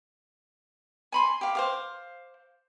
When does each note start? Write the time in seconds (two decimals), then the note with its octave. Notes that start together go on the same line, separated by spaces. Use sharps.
1.12 G#5 B5 C6
1.41 G4 F5
1.55 C5 F5 D6